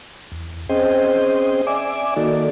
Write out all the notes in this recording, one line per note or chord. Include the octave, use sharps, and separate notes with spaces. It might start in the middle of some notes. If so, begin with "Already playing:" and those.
E2
C4 C#4 G#4 C5 D#5 G5
D5 E5 G#5 D6
D#3 A#3 D#4 F#4 A4 D5